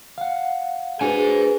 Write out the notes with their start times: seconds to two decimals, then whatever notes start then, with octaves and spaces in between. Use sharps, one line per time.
0.18 F5 F#5
1.01 D4 F#4 G#4 B4 C5 G#5